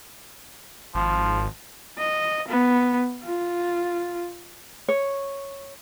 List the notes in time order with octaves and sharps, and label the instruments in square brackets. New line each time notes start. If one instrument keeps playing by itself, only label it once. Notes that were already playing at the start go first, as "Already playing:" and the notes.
[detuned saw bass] G#1 [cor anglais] F3
[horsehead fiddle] D#5
B3
F4
[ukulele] C#5